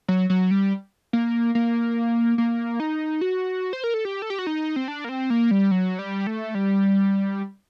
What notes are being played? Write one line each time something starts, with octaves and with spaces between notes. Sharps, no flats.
F#3
F#3
G3
A#3
A#3
A#3
D#4
F#4
C5
A#4
A4
G4
A4
G4
F#4
D#4
C4
D4
A#3
C4
A#3
G3
F#3
G3
A3
G3